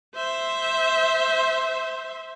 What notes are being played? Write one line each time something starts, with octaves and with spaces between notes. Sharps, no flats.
C5 E5